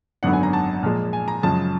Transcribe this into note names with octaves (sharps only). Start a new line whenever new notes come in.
G#1 F#2 D3 F#3 B3 F#5
G#5
A#5
A5
A#2 F3 G#3
G#5
A#5
F#2 C#3 F3 G#3 A5